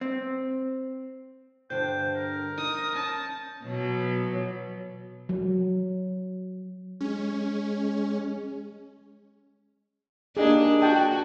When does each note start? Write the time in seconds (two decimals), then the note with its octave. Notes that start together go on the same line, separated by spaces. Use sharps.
0.01 C4
1.70 G2 D3 C5 G5 G6
2.16 A#4
2.57 D#4 D#6
2.95 C#4 A5
3.65 B2 F#3
5.29 F#3
7.01 G#3 C#4
10.37 A#3 D4 D#4 G4 G#4
10.82 F#4 G5 A5